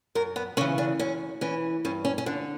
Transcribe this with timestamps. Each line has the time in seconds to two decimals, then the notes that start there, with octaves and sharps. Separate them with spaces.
0.15 F#2 A#4
0.36 B3
0.57 C#3 E3 C#4
0.78 D4
0.99 F#2 C#4
1.41 E3 C#4
1.85 G2 C#4
2.05 C#4
2.18 C#4
2.26 D3 D4